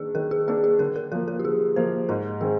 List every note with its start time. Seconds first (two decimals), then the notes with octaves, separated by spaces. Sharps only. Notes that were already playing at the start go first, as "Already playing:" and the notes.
Already playing: D#3 A#3 D4 G#4
0.15 D#3 A#4
0.31 G#4
0.48 A#3 D4 G#4
0.64 G#4
0.79 D3 A#4
0.96 A#4
1.12 F3 A#3 A#4
1.28 A#4
1.40 G4
1.44 D3 G#4
1.76 F3 A#3 C5
2.09 G#2 A#4
2.41 D#3 G#3 C4 G#4